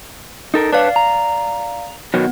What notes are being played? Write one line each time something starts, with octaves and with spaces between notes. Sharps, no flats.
D#4 A4 A#4
D4 B4 C#5 D5 F5
A#5
B2 D#3 F#3 B3